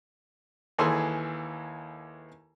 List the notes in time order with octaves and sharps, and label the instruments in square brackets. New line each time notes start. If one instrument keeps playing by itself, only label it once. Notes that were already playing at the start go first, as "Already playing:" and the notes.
[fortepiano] D#2 E3 G#4 A4 G#5 C6